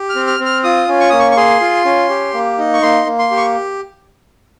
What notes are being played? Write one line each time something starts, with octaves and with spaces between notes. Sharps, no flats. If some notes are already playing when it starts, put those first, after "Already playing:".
Already playing: G4
F6
C4
F6
C4
F6
F4 D#6
C#4
C#6
A#3 D#6
C#6
C#6
G#4 C6
F4
C#4
G4
A#3
D#4
C#6
A#3 C6
A#3
C6
G4
C#6